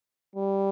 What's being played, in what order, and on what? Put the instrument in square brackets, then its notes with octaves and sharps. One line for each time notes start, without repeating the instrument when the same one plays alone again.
[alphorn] G3